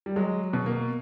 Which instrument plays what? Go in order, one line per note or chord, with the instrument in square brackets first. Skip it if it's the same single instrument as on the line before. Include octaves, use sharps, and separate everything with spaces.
[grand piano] G3
F#3 G#3
B2
A#3